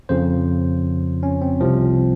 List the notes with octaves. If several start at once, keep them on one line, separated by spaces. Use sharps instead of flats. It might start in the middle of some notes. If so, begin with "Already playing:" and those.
F2 C#3 F3 C5
C#4
C4
C2 C3 F3